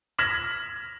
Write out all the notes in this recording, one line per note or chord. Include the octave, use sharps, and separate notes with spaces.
F6 G#6 A#6 B6 E7 F#7